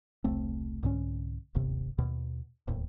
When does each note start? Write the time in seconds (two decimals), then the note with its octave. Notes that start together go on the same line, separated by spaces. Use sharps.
0.24 E1 C2 A3 C4
0.83 C2 G#2 D3 C#4
1.55 D1 G1 D#2 C3
1.98 D#2 B2
2.67 D1 D#2 A2